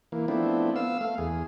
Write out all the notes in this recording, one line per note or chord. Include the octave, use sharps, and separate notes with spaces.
E3 A#3
F3 A3 B3 C4 D4 E4
B3 F5 E6
A3 F5
E2 G#4